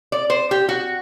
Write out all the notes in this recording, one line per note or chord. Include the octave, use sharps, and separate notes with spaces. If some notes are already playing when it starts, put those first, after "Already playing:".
D5
C5
G4
F#4